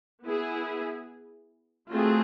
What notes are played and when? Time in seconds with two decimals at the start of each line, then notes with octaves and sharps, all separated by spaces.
0.24 B3 E4 G#4
1.88 F#3 A3 C4 F4 G#4